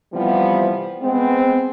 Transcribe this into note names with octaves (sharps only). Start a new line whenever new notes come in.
C3 E3 F3 G3 B3
G#3 B3 C4